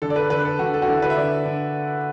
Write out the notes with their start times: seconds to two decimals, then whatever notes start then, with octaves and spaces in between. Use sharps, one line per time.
0.02 D3 A4
0.10 D5
0.16 B4
0.30 D3 B4
0.45 A4
0.59 D3 F#4
0.74 A4
0.82 F#4
0.88 D3 E4
1.02 B4
1.10 E5
1.17 D3 D5
1.45 D3